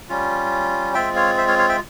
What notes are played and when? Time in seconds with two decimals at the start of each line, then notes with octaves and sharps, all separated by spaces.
0.09 G3 C#4 F4
0.94 G#3 C4 F4 E5 G5
1.16 C#5 F5
1.37 C5 E5
1.48 C#5 F5
1.59 C#5 F5
1.69 E5 G5